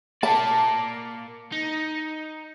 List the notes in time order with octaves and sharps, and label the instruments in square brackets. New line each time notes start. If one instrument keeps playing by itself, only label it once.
[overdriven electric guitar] A#3 D5 [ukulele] A5
[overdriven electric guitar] D#4